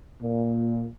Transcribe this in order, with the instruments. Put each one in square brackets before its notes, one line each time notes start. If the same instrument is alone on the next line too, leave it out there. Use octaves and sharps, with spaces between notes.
[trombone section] A#2